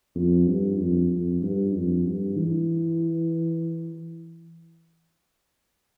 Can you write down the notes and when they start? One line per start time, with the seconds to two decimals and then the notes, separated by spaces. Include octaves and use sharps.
0.15 F2
0.47 G2
0.79 F2
1.11 F2
1.42 G2
1.74 F2
2.06 G2
2.37 E3